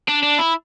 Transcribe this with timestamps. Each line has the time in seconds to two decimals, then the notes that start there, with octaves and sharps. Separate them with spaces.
0.08 D4
0.22 D4
0.38 E4